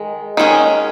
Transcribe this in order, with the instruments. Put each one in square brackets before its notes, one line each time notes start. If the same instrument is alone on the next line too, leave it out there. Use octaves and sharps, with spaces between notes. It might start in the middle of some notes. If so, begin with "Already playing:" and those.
Already playing: [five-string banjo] D#3 G#3
D#3 G#3 C#4